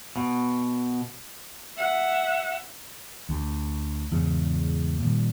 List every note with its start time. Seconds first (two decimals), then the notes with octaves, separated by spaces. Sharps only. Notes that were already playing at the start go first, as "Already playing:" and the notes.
0.16 B2
1.78 E5 F#5
3.29 D2
4.11 E2 G#2 C#3
5.02 A#2 D#3 G3